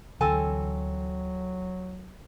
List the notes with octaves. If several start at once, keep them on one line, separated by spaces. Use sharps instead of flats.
D2 D3 E3 F#3 C4 A4 G#5